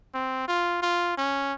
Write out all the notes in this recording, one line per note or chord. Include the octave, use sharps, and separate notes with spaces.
C4
F4
F4
C#4